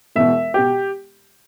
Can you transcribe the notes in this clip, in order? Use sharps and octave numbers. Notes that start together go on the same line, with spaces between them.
E1 E2 B2 E5
B2 G4